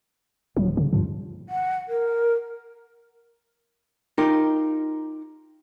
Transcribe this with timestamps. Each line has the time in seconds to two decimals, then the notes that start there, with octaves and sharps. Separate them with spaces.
0.57 D1 D#2 F3 F#3
0.77 C#3
0.93 D2 G2 F3 G3
1.49 F#5
1.88 A#4
4.18 D#4 F4 G4 A#4